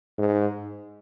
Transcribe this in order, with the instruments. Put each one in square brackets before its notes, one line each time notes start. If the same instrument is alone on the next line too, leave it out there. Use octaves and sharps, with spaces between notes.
[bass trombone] G#2